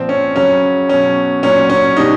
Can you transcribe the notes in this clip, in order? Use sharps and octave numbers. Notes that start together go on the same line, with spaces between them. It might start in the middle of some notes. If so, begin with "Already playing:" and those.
Already playing: A#2 F3 C4
C#4
C#3 F#3 C#4
B2 F#3 C#4
A#2 F#3 C#4
C#4
B2 G3 D#4